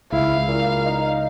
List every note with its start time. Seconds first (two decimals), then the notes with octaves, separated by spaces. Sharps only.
0.12 C#2 E4 F5
0.48 A#2
0.85 D#4